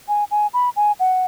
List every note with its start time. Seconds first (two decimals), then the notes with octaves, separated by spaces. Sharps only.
0.08 G#5
0.31 G#5
0.54 B5
0.76 G#5
1.00 F#5